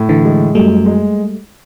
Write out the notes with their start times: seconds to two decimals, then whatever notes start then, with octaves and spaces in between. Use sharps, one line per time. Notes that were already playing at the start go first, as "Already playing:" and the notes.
Already playing: A2
0.09 D3 E3
0.25 G#3
0.55 F#2 G3 A3
0.86 G#3